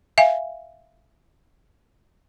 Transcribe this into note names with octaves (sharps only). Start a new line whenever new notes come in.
E5 F5 G#5